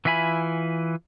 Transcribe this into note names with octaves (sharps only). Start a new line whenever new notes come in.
E3 F4 E5 G#5 B5